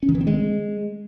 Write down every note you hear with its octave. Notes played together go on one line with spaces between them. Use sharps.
C#4
D#3
E3
C4
G#3